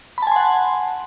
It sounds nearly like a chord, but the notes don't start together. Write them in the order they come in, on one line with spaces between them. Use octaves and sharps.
B5 A5 G#5 C6 F#5